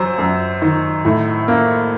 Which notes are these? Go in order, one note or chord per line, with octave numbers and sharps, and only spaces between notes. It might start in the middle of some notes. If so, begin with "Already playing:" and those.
Already playing: F#2 F#3 C5
F#2
D#3
A2
A#3